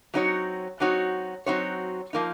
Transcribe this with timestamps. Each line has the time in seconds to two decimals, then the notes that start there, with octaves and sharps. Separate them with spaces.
0.14 F#3 C4 D#4 F#4 C#5
0.80 F#3 C4 D#4 F#4 C#5
1.46 F#3 C4 D#4 F#4 C#5
2.13 F3 A#3 D#4